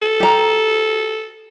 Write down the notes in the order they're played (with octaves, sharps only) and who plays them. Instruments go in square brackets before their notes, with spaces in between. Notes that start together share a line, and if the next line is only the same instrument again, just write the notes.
[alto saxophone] A4
[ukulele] G4 A#5